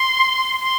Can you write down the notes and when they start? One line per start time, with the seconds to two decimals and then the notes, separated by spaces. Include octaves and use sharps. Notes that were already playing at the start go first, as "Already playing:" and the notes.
Already playing: C6
0.61 C6